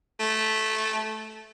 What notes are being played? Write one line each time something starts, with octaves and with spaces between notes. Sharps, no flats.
A3